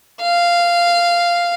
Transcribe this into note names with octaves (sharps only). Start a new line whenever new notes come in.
F5